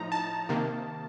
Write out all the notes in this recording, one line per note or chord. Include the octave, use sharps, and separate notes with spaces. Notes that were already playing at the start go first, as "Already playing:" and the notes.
Already playing: A2 F3 D#4 A#5
A5
C3 D#3 A#3